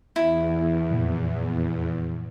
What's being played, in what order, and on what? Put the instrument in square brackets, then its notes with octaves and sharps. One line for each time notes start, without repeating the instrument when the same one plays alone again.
[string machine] E2 [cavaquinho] E4
[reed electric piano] F2 A#2